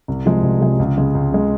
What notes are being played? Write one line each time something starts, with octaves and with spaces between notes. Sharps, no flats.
C2
C3 F3 G#3
C2
C3 F3 G#3
C#2
C#3 G#3
C#2
C#3 G#3